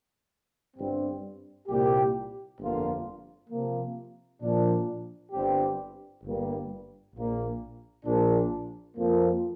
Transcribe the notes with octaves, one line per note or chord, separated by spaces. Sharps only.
G1 G2 G3 C4
C2 A#2 G3 A#3 G4
G1 F2 D3 A#3 F4
C3 F3 A#3
A#2 F3 D4
G1 G2 G3 C4 G4
G1 G2 G3 A#3
A#1 A#2 A#3
A#1 A#2 F3 D4
F2 F3 A#3